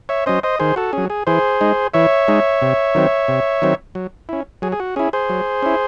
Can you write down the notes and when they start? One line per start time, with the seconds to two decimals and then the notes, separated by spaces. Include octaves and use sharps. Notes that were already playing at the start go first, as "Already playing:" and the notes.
0.09 C#5 E5
0.26 F#3 C#4 C5 D#5
0.43 C5 D#5
0.59 D#3 G#4 C5
0.76 F#4 A4
0.93 F#3 C#4 G#4
1.10 G#4
1.27 E3 G#4 C5
1.61 G#3 D#4
1.94 E3 C#5 E5
2.28 G#3 D#4
2.62 C3
2.95 D#3 F#3 C4
3.28 C3
3.62 D#3 F#3 C4
3.95 F#3
4.29 C#4 E4
4.62 F#3 G#4
4.72 G#4
4.80 F#4
4.96 C#4 E4 G#4
5.13 G#4 C5
5.30 F#3
5.63 C#4 E4